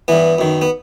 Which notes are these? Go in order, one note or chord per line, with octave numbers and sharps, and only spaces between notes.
G2 E3 B3
F#2 D#3
B3